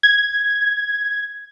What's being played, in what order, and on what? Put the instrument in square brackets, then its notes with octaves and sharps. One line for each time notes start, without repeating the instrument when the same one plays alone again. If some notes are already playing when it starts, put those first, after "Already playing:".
[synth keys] G#6